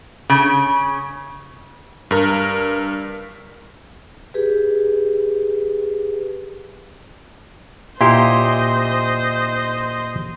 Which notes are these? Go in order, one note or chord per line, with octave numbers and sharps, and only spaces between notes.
C#3
G2 A#4
G4 G#4 B4
A#2 E4 G4 C5 D#5 C6